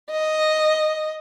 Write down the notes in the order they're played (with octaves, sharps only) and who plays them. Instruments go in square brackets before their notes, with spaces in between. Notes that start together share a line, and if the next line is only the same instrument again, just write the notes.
[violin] D#5